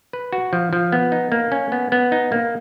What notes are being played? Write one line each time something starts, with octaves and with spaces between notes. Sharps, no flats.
B4
F#4
F3
F3
B3
D#4
A#3
C#4
B3
B3
D#4
A#3